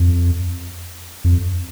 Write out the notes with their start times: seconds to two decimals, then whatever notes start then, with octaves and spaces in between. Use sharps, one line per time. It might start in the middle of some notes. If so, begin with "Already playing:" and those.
Already playing: F2
1.24 F2